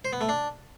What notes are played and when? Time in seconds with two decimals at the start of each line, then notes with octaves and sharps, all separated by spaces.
0.05 C5
0.13 B3
0.21 A3
0.29 D4